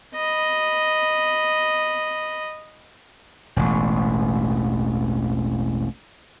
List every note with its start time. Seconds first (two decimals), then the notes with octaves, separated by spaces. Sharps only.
0.15 D#5 B5
3.56 E1 A1